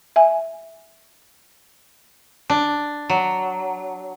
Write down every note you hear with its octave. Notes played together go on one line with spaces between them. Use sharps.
E5 G#5
D4
F#3